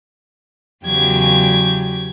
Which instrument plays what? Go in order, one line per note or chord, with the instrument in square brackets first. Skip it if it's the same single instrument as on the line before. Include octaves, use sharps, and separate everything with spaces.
[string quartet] E2 C#3 F#3 G4 G5 G#6